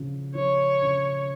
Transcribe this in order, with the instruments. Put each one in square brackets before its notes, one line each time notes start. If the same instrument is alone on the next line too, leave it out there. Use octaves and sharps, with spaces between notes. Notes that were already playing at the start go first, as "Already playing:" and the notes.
Already playing: [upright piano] C#3 F3
[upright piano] F3 [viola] C#5
[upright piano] C#3